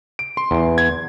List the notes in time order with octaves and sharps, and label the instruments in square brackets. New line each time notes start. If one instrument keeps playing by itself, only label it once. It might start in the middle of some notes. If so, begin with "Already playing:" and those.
[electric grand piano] D7
C6
[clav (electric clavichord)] E2
[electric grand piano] G#6